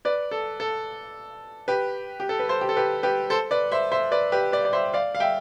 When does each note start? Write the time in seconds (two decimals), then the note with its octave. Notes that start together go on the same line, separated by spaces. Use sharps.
0.05 B4 D5
0.31 A4
0.60 A4
1.68 G4 B4
2.20 G4
2.29 A4
2.39 B4
2.49 A4 C5
2.61 G4
2.69 A4
2.76 G4 B4
3.03 G4 B4
3.30 A4 C5
3.51 B4 D5
3.72 C5 E5
3.92 C5 E5
4.12 B4 D5
4.32 G4 B4
4.52 B4 D5
4.65 D5
4.73 C5 E5
4.94 D5 F5
5.15 F5
5.20 E5 G5